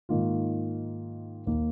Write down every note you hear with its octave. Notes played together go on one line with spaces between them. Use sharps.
G#2 D#3 A#3 F4
D#2 D#3 A#3